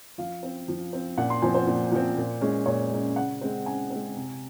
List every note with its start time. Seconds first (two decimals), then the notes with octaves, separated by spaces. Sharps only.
0.18 F3 F5
0.43 C4
0.68 F3
0.93 C4
1.17 A#2 F#5
1.30 C6
1.42 F3 C4 G#5
1.54 C5
1.67 A#2
1.92 F3 C4
2.17 A#2
2.41 G#3 C#4
2.66 A#2 C#5
2.91 G#3 C#4
3.16 C#3 F#5
3.41 G#3 C4
3.66 C#3 G#5
3.90 G#3 C4
4.16 C3